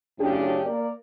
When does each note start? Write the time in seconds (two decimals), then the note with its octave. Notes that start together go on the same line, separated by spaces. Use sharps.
0.19 F#2 A2 C#3 D4 G4
0.66 A#3 A#4 D5